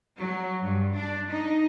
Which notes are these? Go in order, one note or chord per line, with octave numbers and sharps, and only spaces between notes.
F#3
G2
D4
D#4